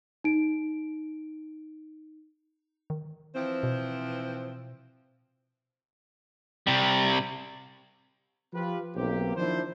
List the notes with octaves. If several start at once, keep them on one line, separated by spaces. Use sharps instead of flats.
D#4 D7
D#3
E3 F3 C4
B2
C3 G3
F3 F4 G4 B4
B1 A#3 C4 G4
D#3 F3 D4 E4 C5